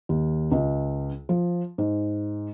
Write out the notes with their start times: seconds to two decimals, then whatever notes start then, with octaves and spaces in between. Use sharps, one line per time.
0.09 D#2
0.51 C#2
1.29 F3
1.78 G#2